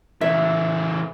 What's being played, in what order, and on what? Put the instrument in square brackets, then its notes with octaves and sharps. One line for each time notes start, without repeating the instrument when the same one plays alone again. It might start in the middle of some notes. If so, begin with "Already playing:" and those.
[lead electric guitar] C#3 E3 [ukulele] E5